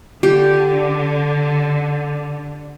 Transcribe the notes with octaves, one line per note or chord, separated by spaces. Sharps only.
D3 G4